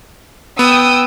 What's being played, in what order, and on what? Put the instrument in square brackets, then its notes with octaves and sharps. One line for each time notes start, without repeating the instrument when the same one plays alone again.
[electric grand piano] B3 [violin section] G5 D#6 E6